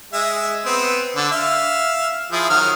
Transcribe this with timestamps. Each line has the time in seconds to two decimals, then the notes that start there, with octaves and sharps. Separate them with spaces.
0.13 G#3 E5
0.66 B3 C4
1.16 D3
1.32 E5 F5
2.32 F3 E4 G#4
2.50 D#3 F#3 F6